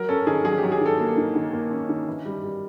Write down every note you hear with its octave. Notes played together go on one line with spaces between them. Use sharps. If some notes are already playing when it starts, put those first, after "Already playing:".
Already playing: F#3 A#4
C#4 A4
D#3 G#4
F#3 G#4
G4
F#3
G#4
D#3
A4
A#3
D#3
D#3
A#3
C#4
D#3
E3
G3
G3